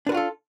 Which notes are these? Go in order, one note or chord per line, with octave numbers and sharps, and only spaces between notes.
D4 F4 F#4 A4 B4